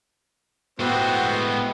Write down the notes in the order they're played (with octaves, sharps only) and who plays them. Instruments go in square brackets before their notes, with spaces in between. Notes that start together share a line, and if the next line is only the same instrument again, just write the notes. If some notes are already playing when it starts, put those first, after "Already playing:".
[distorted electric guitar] A2 G#3 [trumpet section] B3 [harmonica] F#4 C5 [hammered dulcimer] G4 E5 F#5